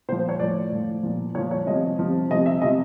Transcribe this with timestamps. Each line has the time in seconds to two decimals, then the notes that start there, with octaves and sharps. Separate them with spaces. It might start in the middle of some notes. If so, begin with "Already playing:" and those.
0.08 A#2 C5
0.12 F3
0.19 C5
0.29 C#5
0.39 A2 F3 D5
0.72 A2 F3
1.03 A#2 F3
1.35 A#2 C#5
1.38 F3
1.51 C#5
1.67 C3 F3 D#5
1.99 C3 F3
2.30 C3 D#5
2.34 F3
2.46 E5
2.62 C3 F3 D#5